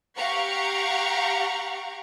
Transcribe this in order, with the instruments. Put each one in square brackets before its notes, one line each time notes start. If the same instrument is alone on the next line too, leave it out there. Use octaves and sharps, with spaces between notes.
[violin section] G4 F5 F#5 A#5 C#6